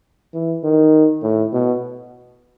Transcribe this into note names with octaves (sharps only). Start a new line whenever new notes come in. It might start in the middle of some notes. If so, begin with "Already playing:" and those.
E3
D#3
A2
B2